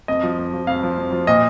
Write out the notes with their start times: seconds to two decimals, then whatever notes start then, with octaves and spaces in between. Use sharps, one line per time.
0.08 F2 D#5
0.23 F3
0.39 F2
0.53 F3
0.67 F2 F5
0.83 F3
0.98 F2
1.12 F3
1.27 A#2 D#5